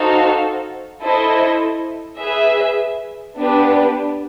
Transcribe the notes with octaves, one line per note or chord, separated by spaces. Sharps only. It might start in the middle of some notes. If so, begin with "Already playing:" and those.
Already playing: D#4 F#4 A4 C5 F5
E4 A4 C5 D#5
G#4 B4 E5
B3 D4 G4 B4